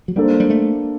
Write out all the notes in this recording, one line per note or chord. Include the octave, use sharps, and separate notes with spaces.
F#3
G3 A#3 D4 A4 C5
G3
A3